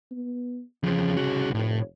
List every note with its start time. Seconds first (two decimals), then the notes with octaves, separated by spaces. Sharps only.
0.11 B3
0.83 E2 C#3 F3
1.17 C2 F#4
1.54 F1 A2